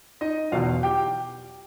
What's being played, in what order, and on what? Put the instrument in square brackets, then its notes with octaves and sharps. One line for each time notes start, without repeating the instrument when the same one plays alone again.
[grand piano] D#4 D#5
E2 B2 F#3 F4 F5
G4 G5